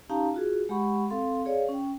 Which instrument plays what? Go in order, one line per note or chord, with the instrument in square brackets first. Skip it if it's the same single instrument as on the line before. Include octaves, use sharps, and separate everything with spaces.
[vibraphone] C#4 D#4 G4 F5 A5 A#5
F4 F#4 G#4
G#3 G4 F#5 B5 C#6
C4 A4 F5 C6
G#4 C#5 D5 F5
C#4 G5